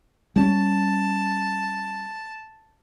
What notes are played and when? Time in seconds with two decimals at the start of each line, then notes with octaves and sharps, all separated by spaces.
0.36 G3 C4 C#4 A5